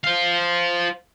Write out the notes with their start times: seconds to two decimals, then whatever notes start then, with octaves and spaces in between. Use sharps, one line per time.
0.04 C5 F5